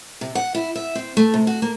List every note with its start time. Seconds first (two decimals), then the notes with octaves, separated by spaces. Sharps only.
0.21 C3
0.35 F#5
0.55 E4
0.76 E5
0.95 C4
1.17 A3
1.34 C3
1.47 F#4
1.62 A#3